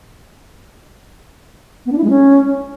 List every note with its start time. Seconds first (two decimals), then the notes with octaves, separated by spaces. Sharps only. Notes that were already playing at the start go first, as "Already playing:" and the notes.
1.86 B3
1.92 D4
1.98 E4
2.04 G#3
2.10 C#4